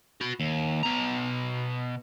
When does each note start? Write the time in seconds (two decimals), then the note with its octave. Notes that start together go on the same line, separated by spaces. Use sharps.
0.21 F#4 B5
0.40 D#2
0.83 B2 A#5